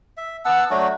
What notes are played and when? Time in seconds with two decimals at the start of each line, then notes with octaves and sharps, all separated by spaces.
0.17 E5
0.45 B3 F#5 A5 E6
0.70 F#3 A3 D4 F#4